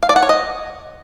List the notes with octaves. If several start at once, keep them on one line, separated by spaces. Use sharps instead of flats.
F5
D5
F#5
C#5
D#5